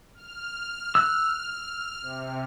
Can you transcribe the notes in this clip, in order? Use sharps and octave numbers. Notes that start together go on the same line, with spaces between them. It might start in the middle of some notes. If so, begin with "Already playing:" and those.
F6
E6 F#6
C3